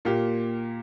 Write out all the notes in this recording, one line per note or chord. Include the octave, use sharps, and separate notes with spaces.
A#2 A#3 G4